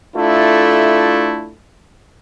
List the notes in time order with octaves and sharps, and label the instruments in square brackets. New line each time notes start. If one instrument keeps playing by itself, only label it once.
[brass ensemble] A3 D4 E4 F4 A4